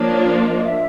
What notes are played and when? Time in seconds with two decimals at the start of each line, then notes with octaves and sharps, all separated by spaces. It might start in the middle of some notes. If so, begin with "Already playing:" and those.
Already playing: F3 A#3 D4 F4 C#5
0.30 D5
0.46 D#5
0.63 E5